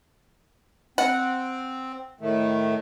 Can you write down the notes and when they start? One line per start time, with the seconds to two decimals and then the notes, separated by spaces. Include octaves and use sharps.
0.98 C4 F#5
2.21 A2 D#3 A3